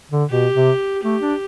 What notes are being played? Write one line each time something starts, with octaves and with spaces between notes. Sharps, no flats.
D3
B2 G4
C3
A3 G4
D4